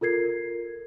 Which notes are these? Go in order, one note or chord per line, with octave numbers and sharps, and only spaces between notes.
F4 A4 A#4 G#6 C7